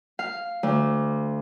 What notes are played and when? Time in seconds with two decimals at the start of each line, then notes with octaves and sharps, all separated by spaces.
0.19 F5
0.63 D2